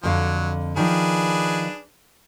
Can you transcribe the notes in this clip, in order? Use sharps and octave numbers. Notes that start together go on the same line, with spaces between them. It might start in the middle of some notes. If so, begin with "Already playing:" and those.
F2 D3 F#3 F5
D#3 F3 D4 G#4 B4